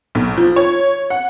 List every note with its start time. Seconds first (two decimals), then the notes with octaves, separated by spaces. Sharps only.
0.15 B1
0.38 F3
0.56 C#5
1.10 F#5